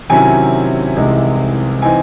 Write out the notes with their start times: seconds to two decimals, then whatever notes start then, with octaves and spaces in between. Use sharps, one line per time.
0.10 C3 D#3 F#3 C#4 E4 G#5
0.96 C2 C3 E3 G#3 D#4
1.82 E3 C4 D#4 G#5